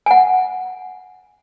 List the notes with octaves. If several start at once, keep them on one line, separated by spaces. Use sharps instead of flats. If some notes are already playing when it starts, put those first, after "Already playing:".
G#5
F#5